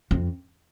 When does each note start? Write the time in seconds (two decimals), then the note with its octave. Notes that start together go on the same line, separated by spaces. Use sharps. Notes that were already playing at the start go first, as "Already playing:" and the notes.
0.11 F2